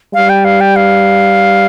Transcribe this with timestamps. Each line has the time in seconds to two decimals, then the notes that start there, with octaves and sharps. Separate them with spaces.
0.14 G3 F5
0.29 G5
0.45 F5
0.61 G5
0.76 F5